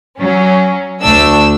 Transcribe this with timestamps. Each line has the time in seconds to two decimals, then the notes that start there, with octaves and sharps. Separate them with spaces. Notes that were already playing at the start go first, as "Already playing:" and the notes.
0.18 F#3 C#4
1.01 D2 A3 D4 E6